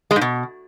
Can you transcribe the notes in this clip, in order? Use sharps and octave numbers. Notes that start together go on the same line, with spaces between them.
G#3
G#2
B2